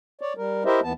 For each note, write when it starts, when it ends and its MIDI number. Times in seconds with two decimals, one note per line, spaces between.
0.21 0.33 73
0.21 0.33 74
0.37 0.64 55
0.37 0.64 70
0.65 0.80 64
0.65 0.80 67
0.65 0.80 70
0.65 0.80 72
0.65 0.80 75
0.65 0.80 76
0.83 0.93 39
0.83 0.93 52
0.83 0.93 59
0.83 0.93 81